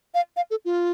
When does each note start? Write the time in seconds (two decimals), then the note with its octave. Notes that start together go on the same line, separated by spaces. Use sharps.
0.14 F5
0.36 F5
0.50 A4
0.65 F4